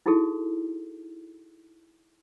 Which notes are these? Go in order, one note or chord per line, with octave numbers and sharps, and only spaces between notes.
D#4 E4 F#4 G#4 A4